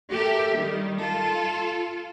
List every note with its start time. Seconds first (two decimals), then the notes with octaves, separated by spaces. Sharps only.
0.13 G4 A4 A#4 E5
0.56 D#3 G3
1.01 F4 A4